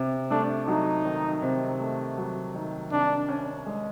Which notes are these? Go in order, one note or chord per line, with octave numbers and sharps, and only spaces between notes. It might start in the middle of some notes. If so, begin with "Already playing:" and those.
Already playing: C3
A3 D4
F#3 D#4
D#3
C3
A3
F#3
D#3
C2 D4
C#4
G#3